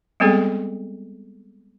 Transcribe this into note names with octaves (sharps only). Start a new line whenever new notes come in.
G3 G#3 B3 C4 G#4 A4